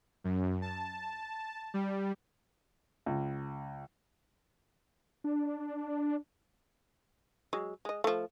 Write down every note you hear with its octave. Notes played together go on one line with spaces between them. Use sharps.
F#2
A5
G3
C#2
D4
F#3 G#3
G#3 D#5
F3 A3